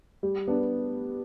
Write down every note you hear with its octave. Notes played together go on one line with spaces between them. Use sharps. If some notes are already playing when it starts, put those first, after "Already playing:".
G3
B3 D4